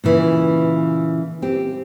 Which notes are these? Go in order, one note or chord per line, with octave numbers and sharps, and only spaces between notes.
A#2 C#3 E3
C4 G4